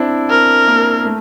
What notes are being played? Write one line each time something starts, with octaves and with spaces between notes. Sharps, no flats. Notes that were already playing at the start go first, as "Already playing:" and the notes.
Already playing: C4 D4 E4
C4 A#4
A#3
A3